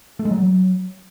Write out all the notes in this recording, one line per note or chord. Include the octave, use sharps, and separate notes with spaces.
A3
G#3
F#3